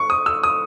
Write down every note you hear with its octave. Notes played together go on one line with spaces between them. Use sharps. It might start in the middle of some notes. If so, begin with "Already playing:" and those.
Already playing: C#6
D#6
E6
D#6